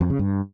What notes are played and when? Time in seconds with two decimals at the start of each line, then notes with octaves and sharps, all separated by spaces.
0.01 F2
0.10 C#3
0.19 G2